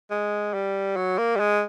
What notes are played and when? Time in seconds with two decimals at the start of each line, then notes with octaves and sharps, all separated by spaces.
0.11 G#3
0.53 G3
0.96 F#3
1.18 A#3
1.36 G3
1.40 G#3